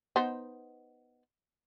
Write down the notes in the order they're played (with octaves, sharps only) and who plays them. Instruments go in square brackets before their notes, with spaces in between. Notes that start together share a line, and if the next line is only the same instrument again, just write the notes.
[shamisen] B3 D#4 C5